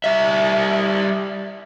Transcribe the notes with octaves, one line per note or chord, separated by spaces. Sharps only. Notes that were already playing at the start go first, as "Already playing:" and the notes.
G3 E5